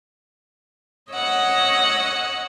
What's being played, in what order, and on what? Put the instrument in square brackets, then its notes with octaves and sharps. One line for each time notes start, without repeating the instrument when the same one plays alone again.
[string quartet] C#5 D#5 F#5 E6